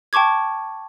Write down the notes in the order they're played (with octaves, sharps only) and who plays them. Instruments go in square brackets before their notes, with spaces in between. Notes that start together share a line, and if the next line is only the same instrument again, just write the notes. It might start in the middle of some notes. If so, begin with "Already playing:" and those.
[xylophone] G5 A5 C#6 D6 G#6